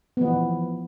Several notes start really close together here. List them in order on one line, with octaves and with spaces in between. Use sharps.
B3 F3 E3